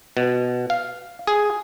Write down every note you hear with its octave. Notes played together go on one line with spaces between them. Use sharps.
B2
F5
G#4